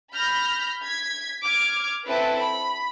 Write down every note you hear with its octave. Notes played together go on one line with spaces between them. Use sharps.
B5 F6 G6 A#6
G#6 B6
D6 F6 G#6
C4 E4 A4 B4
B5